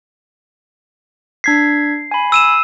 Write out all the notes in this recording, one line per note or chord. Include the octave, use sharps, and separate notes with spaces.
D4 G#6 B6 C7
G#5 B5
E6 D#7 E7